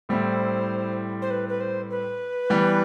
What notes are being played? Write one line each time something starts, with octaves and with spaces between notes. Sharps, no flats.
A2 G3 C4 E4 C5
C5
B4
B4
C5
B4
E3 G3 B3